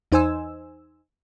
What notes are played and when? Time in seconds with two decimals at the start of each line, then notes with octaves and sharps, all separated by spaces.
0.12 E2 D#4 C5 G#5 E6